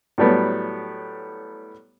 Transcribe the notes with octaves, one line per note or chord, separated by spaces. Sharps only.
A2 F#3 G3 A3 B3